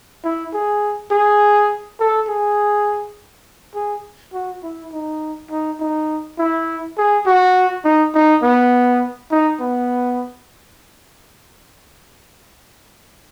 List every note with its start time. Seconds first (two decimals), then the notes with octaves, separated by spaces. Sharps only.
0.24 E4
0.53 G#4
1.11 G#4
2.00 A4
2.28 G#4
3.75 G#4
4.33 F#4
4.63 E4
4.92 D#4
5.51 D#4
5.80 D#4
6.38 E4
6.98 G#4
7.26 F#4
7.85 D#4
8.15 D#4
8.43 B3
9.31 D#4
9.60 B3